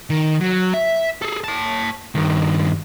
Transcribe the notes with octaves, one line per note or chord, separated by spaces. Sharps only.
D#3
F#3
E5
G#4 A4
C#5 A5
G2 D#3